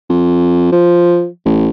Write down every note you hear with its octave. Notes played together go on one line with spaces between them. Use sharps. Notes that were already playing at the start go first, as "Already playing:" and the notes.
F2
F3
A1